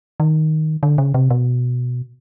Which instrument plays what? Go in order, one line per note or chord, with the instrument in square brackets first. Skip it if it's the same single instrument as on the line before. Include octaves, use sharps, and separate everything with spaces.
[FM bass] D#3
D3
C#3
C3
B2